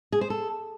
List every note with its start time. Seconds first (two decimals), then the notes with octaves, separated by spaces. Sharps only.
0.12 G#4
0.21 C5
0.30 A4